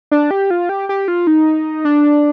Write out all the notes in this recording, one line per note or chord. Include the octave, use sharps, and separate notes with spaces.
D4
G4
F4
G4
G4
F4
D#4
D4